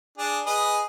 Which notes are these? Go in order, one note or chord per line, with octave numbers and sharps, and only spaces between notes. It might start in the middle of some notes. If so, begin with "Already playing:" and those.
D4 G#4
G#4 B4 D#5